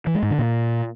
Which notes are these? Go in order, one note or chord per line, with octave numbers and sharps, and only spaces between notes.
E3
G#3
G#2
D3
A#2